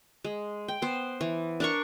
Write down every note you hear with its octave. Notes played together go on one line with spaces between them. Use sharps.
G#3
G5
B3 C5
E3
D4 A#4 C#6